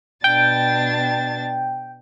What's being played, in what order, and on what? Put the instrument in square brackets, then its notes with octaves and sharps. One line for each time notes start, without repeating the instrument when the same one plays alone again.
[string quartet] B2 D4 A6 [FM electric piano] G5